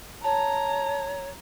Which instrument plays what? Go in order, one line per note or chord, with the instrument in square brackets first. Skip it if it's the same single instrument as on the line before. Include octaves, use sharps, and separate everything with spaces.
[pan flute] C#5 [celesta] A5 [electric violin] A#5